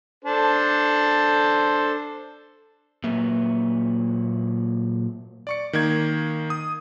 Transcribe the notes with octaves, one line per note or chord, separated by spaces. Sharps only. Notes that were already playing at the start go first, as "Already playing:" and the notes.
D4 A4 C5
A#2 F#3 A#3 B4 E5
D5 C#6 C#7
D#3 A#3 G#6
D#6